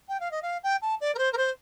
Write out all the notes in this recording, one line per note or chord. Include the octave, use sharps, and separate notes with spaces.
G5
F5
D#5
F5
G5
A5
D5
A#4
C5
A#4
C5